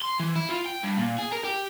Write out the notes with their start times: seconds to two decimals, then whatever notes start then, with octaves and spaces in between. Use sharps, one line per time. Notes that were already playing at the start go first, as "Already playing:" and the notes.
0.02 C6
0.20 E3
0.36 E4
0.49 F4
0.66 G5
0.83 G2
0.98 A#2
1.18 G#4
1.32 A#4
1.45 G4